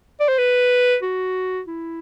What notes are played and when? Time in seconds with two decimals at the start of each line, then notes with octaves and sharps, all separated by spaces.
0.20 D5
0.28 C5
0.38 B4
1.03 F#4
1.67 E4